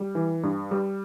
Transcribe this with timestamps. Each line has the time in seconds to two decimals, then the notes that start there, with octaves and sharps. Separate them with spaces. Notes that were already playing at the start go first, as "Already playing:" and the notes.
Already playing: G3
0.15 E3
0.43 G2
0.71 G3